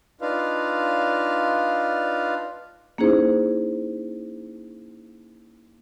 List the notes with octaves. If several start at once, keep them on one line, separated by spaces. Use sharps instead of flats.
D4 D#4 F4 B4 F5
A#3 C#4 D#4 E4 G#4 C5